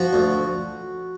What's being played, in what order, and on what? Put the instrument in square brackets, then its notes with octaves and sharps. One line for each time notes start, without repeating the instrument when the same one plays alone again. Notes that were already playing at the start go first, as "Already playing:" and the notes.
Already playing: [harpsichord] F3 F#4
D2